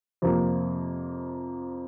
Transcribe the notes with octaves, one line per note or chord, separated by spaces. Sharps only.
F2 C3 F3 A#3